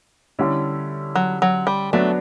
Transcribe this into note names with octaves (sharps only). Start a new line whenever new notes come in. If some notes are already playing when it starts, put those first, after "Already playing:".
D3 G3 C#4 E4
F#3
F#3
G3
F#3 A3 B3 D4